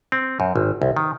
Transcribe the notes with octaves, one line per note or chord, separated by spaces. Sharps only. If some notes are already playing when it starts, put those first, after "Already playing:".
C4
F#2
G#1
C2
D#3